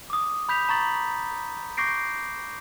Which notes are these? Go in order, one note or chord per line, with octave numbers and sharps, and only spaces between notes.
D6 D#6
B5 G6 B6 F7
A#5 C#6 A6 F#7
C#6 D6 G6 A#6 C7 D7